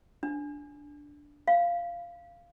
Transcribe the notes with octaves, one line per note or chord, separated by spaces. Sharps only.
D4
F5